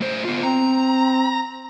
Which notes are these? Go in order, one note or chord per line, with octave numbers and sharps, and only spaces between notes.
A2 C5
B3 F4
C4 A#5